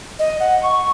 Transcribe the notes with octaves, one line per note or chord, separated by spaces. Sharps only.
D#5
F#5
C#6